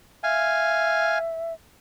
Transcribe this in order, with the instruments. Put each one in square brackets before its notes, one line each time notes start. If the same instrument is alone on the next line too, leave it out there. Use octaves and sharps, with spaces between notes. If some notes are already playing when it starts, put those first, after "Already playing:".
[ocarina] E5 [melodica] F5 G#5